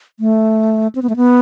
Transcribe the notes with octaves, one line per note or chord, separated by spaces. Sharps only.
A3
C4
B3
A3
B3